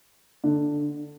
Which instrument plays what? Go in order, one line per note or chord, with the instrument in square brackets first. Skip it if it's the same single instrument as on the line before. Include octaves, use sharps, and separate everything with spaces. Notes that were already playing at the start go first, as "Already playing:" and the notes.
[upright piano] D3